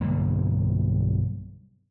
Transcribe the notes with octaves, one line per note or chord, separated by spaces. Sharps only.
B1 G2 D3 A#3